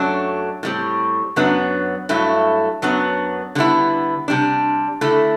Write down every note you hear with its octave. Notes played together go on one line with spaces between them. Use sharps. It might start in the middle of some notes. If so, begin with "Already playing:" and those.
Already playing: F#2 F#3 A3 D4
A2 G3 C4
F#2 F#3 B3 D4
G2 F#3 A3 E4
F#2 F#3 B3 D4
D3 G3 B3 E4
C3 G3 D4
D3 A3 E4